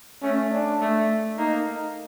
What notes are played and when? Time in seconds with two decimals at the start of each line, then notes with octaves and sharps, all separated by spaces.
0.23 A3 C#4
0.52 D4
0.81 A3
1.38 A#3 D#4